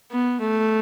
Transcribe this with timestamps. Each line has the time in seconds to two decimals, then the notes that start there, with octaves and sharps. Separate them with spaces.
0.12 B3
0.41 A3